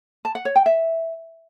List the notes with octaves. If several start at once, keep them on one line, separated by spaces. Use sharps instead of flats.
A5
F#5
C#5
G5
E5